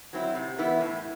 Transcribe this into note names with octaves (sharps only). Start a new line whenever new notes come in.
F#3 C4 E4
C3
E3 B3 E4
A2